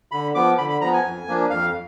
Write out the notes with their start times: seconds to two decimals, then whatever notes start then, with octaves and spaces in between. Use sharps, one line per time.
0.12 D3 B5
0.35 F3 B3 D6
0.58 D3 B5
0.70 B5
0.81 F3 B3 A#5
0.93 G#5
1.04 F2
1.28 F3 A#3 D4
1.50 F2 F5